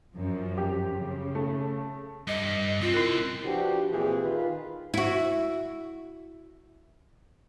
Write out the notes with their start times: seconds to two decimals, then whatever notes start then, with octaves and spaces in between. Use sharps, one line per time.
0.13 F#2 F3
0.58 G4
0.94 C#3
1.35 A3
2.27 G2 D#5
2.81 C2 C4 F4
2.94 E4 A#4
3.44 F3 B3 D4 F#4 G4
3.90 A#2 E3 C4 F4 G4 G#4
4.22 D#3 F4 B4
4.94 E4 F#4